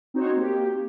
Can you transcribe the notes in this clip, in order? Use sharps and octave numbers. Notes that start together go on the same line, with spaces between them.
C4 D#4 F#4 C5 C#5
A#3 G4